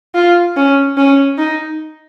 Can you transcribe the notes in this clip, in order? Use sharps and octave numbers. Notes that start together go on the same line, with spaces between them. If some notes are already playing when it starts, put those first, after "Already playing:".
F4
C#4
C#4
D#4